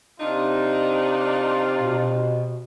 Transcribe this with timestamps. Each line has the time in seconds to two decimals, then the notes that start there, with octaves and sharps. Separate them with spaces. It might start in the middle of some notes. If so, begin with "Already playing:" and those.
0.20 C3 D4 D#4 F4
1.80 B2